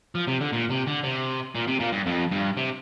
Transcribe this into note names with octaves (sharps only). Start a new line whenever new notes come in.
F3
C3
D3
A#2
C3
D3
C3
A#2
C3
A#2
G2
F2
G2
C3